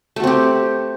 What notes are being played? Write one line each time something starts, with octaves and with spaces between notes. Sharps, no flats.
A3 C4 F#4 G4